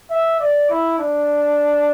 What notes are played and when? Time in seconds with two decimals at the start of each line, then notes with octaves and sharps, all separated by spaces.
0.10 E5
0.40 D5
0.70 E4
0.99 D4